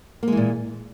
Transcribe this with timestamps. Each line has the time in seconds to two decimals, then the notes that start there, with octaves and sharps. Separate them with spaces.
0.23 A#3
0.28 G#3
0.32 E3
0.37 A#2